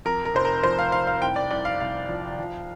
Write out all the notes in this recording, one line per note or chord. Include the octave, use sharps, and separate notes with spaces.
F2 A#4
A#4
F1 C5
A#4
F3 C5
F5
F1 F5
F5
C2 G5
D5
C2 D5
F5
C2 F5
F3
F3